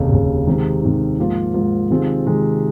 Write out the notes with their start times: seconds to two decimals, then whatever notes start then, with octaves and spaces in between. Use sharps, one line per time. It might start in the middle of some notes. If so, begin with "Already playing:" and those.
Already playing: F1 D#2 C#3
0.11 F1 D#2 C#3
0.47 C3 D#3 G#3 C4 D#4
0.82 C3 D#3 G#3 C4 D#4
1.18 G#2 F3 A#3 F4
1.54 G#2 F3 A#3 F4
1.90 C3 D#3 G#3 C4 F4
2.26 C3 D#3 G#3 C4 F4